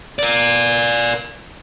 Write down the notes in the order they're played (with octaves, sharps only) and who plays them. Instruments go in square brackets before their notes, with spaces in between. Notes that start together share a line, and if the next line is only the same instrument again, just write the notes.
[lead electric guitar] A#4 D5